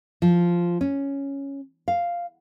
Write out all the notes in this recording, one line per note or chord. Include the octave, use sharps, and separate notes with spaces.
F3
C#4
F5